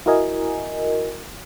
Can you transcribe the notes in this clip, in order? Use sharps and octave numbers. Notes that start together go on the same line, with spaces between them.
E4 F#4 A#4 D#5 G#5